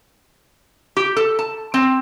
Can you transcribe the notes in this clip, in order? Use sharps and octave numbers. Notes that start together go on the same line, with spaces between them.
G4
A4
A5
C4